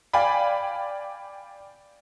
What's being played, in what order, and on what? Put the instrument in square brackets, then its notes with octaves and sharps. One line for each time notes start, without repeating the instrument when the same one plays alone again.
[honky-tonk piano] D5 F5 G5 G#5 B5